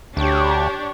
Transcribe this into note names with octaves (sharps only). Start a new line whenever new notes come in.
D2 D4 G4 C#5